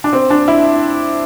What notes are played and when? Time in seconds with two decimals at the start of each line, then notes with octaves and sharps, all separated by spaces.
0.04 D4
0.13 C4
0.30 D4
0.48 E4